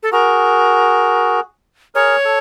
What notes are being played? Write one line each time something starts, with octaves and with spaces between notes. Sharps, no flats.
A4
F#4 G#4 A#4
G#4 A#4 C#5
A4